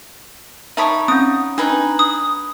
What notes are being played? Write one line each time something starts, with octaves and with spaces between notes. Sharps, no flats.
D#4 C#5 E5 A5 B5 D#6
C4 C#4 D#6
D4 D#4 B4 G#5
D#6